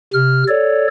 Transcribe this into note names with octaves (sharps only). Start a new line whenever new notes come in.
C3 F6
A4 C#5 D5